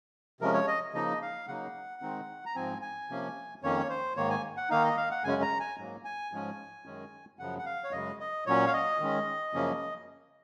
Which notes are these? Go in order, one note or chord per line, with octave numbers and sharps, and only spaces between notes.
C3 F3 G#3 C#4 A#4
C#5
D#5
C#3 F3 A#3 D#4 D#5
F5
C#3 F#3 A#3 D#4 F#5
D#3 G#3 C4 D#4
A#5
G#2 F3 C4 G#5
G#5
C3 F3 A#3 C#4
F2 D#3 A#3 C#4 C#5
C5
G#2 D#3 A#3 C#5
G#5
F#5
D#3 A#3 D#4 F5
D#5
F5
F#5
F#2 C#3 G#3 C#4 G#5
A#5
G#5
G#2 F#3 A#3
G#5
G#2 F3 G#3 C#4
F#2 D#3 G#3 C#4
F#2 C#3 F3 F#5
F#5
F5
C#5
F#2 C#3 G#3 D#5
D#5
A#2 F#3 C#4 C#5
F5
D#5
D#3 G#3 C#4
F#2 C#3 F3 A#3 C#4